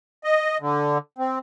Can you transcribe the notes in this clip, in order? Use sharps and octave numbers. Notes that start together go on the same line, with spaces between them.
D#5
D3
C4